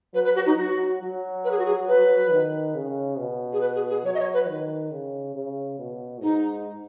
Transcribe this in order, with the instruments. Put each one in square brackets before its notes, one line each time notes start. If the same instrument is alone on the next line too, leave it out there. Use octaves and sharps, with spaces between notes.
[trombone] F#3 [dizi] B4
[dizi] B4
F#4
D#4
[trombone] F#3 [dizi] F#4
[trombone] F#3
[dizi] B4
G#4
F#4
G#4
B4
[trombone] D#3
C#3
B2
[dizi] G#4
B4
G#4
G#4
[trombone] F#3 [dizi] C#5
[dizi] D#5
C#5
B4
[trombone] D#3
C#3
C#3
B2
[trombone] G#2 [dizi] D#4